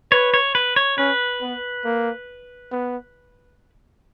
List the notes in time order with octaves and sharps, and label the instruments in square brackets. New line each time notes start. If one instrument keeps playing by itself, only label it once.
[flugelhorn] B4 [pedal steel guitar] C#5
[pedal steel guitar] C#5
B4
C#5
[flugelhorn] C#4 [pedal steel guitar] B4
[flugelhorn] B3
A#3
B3